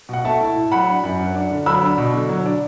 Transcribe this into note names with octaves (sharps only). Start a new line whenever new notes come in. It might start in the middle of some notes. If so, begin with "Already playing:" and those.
B2 F#5
A3 E5 A5
E4
A2
F#3 F#5 B5
D4
F#2
F#3
D4
D3
F#3 B5 E6
D4
B2
D3
F#3
D4